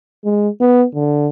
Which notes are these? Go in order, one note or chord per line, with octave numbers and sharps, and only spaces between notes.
G#3
B3
D3